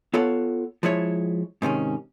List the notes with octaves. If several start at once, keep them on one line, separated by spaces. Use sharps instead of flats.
B3 F4 A4 C#5 F#5
F3 G#3 E4 C#5
G#2 C3 D#3 C#4